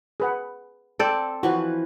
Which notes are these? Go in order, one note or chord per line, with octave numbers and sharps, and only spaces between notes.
G#4 B4 F#5
C4 A4 D5
E3 F3 F#4 B4